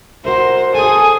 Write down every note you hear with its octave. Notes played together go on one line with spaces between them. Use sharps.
F#4 A#4 C5 E5
G#4 A4 G#5 D#6